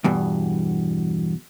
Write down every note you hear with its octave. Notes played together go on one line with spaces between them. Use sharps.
E2 G2 B2